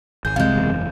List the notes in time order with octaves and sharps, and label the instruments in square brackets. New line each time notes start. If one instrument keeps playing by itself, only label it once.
[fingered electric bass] G#1 [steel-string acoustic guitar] G#4 [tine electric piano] G6
[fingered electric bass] C2 [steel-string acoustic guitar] C3 G#3 [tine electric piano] F5 G6
[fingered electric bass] F#1 E2